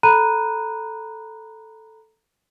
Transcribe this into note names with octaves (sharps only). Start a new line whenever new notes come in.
A4 A#5 B5 F#6 D#7